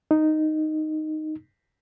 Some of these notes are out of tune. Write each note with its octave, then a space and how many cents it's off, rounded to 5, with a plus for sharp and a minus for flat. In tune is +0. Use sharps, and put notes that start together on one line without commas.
D#4 -5